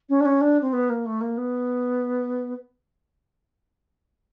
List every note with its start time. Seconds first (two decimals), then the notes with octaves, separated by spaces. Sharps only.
0.09 C#4
0.20 D4
0.25 C#4
0.41 D4
0.62 C4
0.73 B3
0.89 A#3
1.06 A3
1.21 A#3
1.37 B3